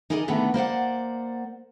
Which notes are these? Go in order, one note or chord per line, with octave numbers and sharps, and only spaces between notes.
D#4 G#4 A#4 D5 D#5
B2 D3 D#3 A3 B3
A#3 C5 D5 F#5